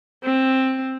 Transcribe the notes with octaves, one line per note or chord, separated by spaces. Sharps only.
C4